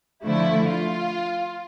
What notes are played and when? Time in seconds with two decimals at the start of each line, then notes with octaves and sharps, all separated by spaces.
0.24 D3 F3 A3 E4
0.69 F4